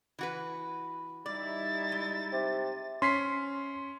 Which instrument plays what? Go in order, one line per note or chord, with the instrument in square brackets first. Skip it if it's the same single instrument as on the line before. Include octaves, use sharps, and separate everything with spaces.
[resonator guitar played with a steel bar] E3 F#4 B4
[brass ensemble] G3 D#4 E4 [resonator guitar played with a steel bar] D5 [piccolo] A6
[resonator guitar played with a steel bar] G#3
[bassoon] C3
[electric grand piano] C#4 B6 C7 [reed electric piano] C6